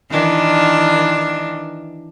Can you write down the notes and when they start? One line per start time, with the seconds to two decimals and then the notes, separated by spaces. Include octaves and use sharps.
0.11 D#3 E3 D4